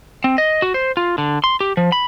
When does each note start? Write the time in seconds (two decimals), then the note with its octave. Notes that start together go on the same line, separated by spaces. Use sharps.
0.24 C4
0.38 D#5
0.62 F#4
0.74 C5
0.97 F4
1.18 D3
1.44 C6
1.60 G4
1.77 F3
1.92 B5